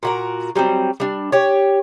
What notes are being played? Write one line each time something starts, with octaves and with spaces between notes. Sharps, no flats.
A#2 F#4 A#4
F#3 G3 B3 C4
G3 D4
G4 C#5